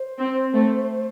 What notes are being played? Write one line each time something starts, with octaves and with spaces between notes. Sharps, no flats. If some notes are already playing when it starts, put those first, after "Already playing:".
Already playing: C5
C4
A3